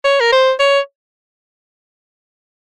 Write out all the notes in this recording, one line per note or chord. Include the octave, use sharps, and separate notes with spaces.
C#5
A#4
C5
C#5